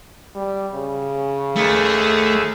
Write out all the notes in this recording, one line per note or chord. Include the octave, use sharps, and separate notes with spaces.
G3
C#3
D#2 A3 G#4 E5